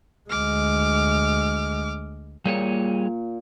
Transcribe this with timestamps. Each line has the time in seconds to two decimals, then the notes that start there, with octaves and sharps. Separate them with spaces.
0.30 D2 G#3 D6 F6
2.45 A#2 G3 G#4 C#5